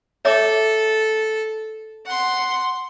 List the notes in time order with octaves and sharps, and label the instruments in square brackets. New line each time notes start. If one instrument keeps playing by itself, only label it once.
[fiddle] A4 [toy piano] C#5 E5 D6
[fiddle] F#5 C6